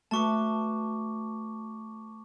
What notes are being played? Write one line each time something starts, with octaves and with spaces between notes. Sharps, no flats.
A3 F#4 B4 A5 C#6 D6